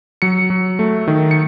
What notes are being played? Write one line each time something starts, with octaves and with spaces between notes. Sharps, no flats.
F#3 C#7
F#3
A3
D#3
C#7